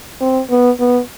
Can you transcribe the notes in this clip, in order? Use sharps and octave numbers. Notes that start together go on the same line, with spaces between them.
C4
B3
B3